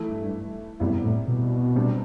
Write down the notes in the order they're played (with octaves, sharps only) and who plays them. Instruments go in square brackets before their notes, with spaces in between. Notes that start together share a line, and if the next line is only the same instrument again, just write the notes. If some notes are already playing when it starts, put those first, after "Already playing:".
Already playing: [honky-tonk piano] E3 A3 E4
[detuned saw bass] G2
[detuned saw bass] F#2 [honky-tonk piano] C3 G3 B3 E4
[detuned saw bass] A2
B2
[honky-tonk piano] C3 G3 D4